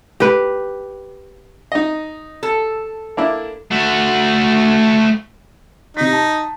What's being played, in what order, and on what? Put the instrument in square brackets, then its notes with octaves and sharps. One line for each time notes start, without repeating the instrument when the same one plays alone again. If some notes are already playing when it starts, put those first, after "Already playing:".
[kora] G4 B4
[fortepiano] D#4 D#5
[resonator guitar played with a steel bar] A4
[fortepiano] A#3 D4 E4
[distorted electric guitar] A3 F#4
[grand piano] C3 B6 [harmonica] D#4
[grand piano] A5